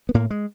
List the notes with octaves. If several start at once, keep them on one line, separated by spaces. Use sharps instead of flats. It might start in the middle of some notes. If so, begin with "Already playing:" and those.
B3
A2 A#3
G#3